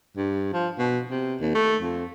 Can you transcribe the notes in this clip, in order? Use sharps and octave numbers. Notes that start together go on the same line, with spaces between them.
G2
F3
B2
C3
D#2
A3
F2